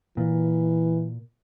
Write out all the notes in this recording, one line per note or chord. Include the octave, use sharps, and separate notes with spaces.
A#2 E3